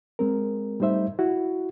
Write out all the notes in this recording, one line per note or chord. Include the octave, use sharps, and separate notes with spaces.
G#3 C4 A#4
G3 A3 D#4 C5 E5
E4 F#4